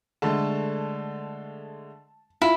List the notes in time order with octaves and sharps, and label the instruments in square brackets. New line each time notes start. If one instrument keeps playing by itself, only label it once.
[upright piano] D3 G#3 A3 [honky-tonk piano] A5
[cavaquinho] E4 [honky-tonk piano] F4